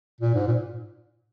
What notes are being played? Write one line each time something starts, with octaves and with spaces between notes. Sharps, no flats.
A#2
G#2
A#2